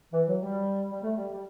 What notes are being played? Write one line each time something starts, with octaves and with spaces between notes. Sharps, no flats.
E3
F#3
G3
G3
A3
G3
G3